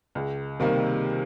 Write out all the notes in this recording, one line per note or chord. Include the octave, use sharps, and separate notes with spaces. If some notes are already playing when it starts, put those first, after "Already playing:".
C#2
C3 D#3 G3 A#3